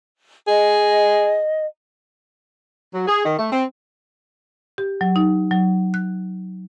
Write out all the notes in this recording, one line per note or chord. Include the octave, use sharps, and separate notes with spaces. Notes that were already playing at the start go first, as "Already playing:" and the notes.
G#4 D#5
F#3
G#4
D#3
A3
C4
G4
F#3
D#4
F#3
F#6